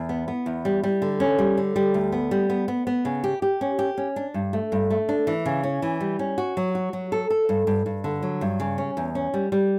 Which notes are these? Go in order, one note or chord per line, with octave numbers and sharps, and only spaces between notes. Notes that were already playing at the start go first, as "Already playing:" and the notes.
Already playing: E2
B3
B3
E2
G3
G3
D3
C#4
G3
D3
G3
D2
B3
G3
B3
B3
B3
C#3
G4
G4
C#4
G4
C#4
D4
G2
A3
G2
A3
D4
E3
C#3
C#4
E3
G3
C#4
F#4
F#3
F#4
F#3
A4
A4
G2
G2
G2
D3
F#3
G2
C#3
C#4
E2
C#4
G3
G3